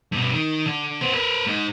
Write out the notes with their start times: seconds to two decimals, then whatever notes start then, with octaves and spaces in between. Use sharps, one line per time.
0.12 G2 B2
0.33 D#3
0.66 D3
1.01 B3 C5
1.14 A#4 B4
1.46 G#2 D#4